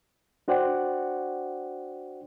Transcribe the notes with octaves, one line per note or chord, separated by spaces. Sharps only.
D4 F#4 C5 D5 F#5 G5